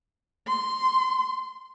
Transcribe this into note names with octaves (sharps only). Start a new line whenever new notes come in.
C6